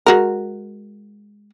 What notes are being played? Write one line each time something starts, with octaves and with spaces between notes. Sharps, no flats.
G#3 F#4 A#4